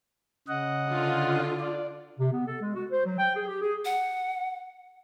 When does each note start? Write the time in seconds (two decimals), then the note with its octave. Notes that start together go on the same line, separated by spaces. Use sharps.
0.48 C#3 D#5 F#5
0.89 D3 F4
1.59 D5
2.19 C3
2.32 B3
2.47 A4
2.61 G#3
2.74 F#4
2.91 C5
3.05 F#3
3.19 G5
3.35 G#4
3.47 G4
3.61 G#4
3.85 F#5